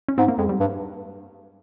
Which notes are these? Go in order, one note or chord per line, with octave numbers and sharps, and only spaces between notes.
C#4
G#2 C4
A#3
F2 G#3
G3
G2